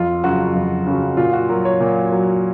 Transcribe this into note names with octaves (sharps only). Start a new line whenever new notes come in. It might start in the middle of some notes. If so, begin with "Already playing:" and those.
Already playing: F2 F4
C#3 F#3 F#4
F2
C#3 F#3
A#2 F4
F#4
F#3 A#4
C#5
A#2
F#3